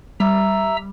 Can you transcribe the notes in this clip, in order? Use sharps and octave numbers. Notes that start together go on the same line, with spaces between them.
G3 E5 A#5 E6